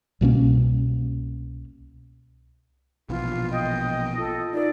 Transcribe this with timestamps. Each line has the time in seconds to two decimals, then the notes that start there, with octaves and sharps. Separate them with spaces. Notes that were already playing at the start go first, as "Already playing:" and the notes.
0.21 C2 B2 A#3 C#4
3.09 A#1 B2 E3 F4
3.51 D#5 G5
4.18 F4 A4
4.53 D#4 F4 A#4 D5